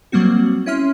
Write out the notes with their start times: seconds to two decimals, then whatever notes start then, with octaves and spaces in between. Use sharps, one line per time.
0.12 F#3 G3 A#3 C4 F#4
0.66 C#4 E4 E5 C6 F6